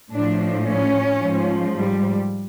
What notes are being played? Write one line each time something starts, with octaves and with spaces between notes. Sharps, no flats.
A2 F3 D4
C#4
G#2 F3
G3